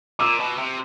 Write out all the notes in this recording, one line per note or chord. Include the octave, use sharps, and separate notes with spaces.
A#2 D6 E6
B2
C3